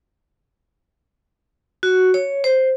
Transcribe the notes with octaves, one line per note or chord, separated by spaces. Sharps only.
F#4
C#5
C5